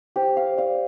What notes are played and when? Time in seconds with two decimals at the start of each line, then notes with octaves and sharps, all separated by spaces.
0.16 G4 C5
0.37 F5
0.52 C5
0.57 D5 F5